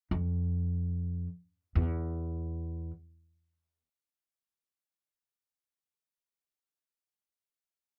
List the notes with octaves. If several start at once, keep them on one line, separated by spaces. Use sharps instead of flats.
F2
E2